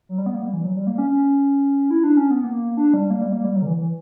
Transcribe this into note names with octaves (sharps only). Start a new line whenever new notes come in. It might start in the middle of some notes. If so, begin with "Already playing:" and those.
F#3
G3
B3
A#3
G3
E3
F#3
G3
A#3
C#4
C#4
E4
D4
C#4
B3
A#3
D4
G3
A#3
G3
A#3
G3
F#3
D3
E3
E3